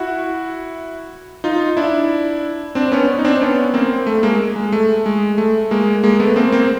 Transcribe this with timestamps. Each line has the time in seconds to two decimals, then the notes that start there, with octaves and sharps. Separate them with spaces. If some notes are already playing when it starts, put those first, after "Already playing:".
Already playing: E4 F#4
1.44 D#4 F4
1.77 D4 E4
2.75 C4 D4
2.92 B3 C#4
3.19 D#4
3.25 C4 D4
3.41 B3 C#4
3.74 A#3 C4
4.07 A3
4.23 G#3 A#3
4.56 G#3
4.72 A3
5.06 G#3
5.38 A3
5.71 G#3 A#3
6.03 G#3 A#3
6.20 A3 B3
6.36 A#3 C4
6.52 A#3 C4